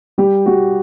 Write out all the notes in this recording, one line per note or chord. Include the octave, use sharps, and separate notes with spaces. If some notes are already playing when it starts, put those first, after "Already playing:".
G3 G4
G3 F#4